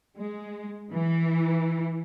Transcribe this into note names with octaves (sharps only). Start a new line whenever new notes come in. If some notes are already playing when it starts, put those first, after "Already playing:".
G#3
E3